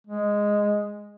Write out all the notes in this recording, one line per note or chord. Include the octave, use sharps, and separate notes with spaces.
G#3